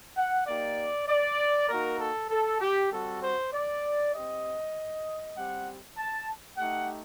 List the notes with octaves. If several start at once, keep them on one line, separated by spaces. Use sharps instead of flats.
F#5
A#3 D#4 G4 D5
D5
A#3 D#4 F#4 A#4
A4
A4
G4
G3 C4 F#4 A4
C5
D5
C4 G4 D#5
G3 C4 G4 F#5
A5
A3 D#4 G4 F#5